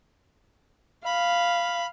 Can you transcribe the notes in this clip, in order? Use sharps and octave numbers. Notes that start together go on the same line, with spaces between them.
F5 B5